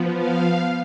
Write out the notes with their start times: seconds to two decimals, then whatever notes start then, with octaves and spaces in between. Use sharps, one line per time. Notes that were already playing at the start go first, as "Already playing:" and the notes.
Already playing: F3 B3
0.15 F5